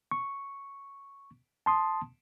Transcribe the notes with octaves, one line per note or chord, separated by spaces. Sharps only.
C#6
A5 C6 D#6